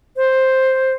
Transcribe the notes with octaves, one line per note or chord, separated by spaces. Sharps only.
C5